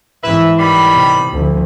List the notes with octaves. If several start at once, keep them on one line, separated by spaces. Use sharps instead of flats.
G#2 E3 E4 B4 E5
D#3 G3 B5
C3
D2 F3